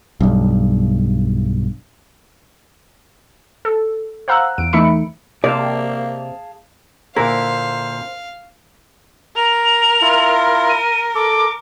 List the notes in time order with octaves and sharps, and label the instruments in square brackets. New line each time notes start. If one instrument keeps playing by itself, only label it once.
[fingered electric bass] B1 G2
[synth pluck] A4
C5 F5 F#5 A#5 E6 F#6
E2 D7
E3 A3 D#4 E5 B5 C#7
[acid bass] C3 [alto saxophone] A#3 [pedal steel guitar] G#4 F5 A5 [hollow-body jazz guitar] D5
[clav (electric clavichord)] A#2 D3 E4 [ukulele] A#4 [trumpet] C5 [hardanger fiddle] F5
[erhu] A#4 [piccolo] F7
[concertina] E4 F4
[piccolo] D#7
[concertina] A4 [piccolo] D6